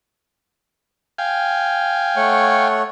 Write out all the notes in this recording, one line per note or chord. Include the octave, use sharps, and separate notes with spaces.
F5 G5 G#5
A3 C#5 F#5